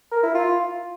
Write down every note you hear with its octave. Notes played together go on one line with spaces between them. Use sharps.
A#4
E4
F4